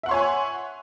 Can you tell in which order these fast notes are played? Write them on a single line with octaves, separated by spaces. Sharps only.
E5 F#5 C6 C#5 G#5